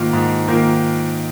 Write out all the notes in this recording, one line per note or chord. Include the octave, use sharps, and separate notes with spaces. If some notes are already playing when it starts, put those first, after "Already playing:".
Already playing: G#2 D#3 A#3 F4
G#2
D#3 A#3 F4